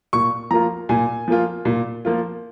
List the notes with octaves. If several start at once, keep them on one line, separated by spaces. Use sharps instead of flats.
A#2 C#6
F3 A#3 F4 A#5
A#2 G#5
F3 A#3 F4
A#2
F3 A#3 F4